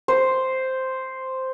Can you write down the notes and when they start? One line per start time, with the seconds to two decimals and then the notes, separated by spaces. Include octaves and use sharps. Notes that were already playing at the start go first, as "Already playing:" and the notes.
0.08 C5